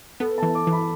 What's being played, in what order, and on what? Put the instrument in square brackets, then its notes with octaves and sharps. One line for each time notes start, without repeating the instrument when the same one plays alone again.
[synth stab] B3 [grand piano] A4
[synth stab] E3 [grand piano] A5
[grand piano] D6
[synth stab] E3
[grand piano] B5